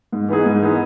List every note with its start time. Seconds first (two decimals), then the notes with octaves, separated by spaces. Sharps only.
0.13 G#2
0.29 E3 B3 D#4 G#4
0.46 G#2
0.62 E3 B3 D#4 G#4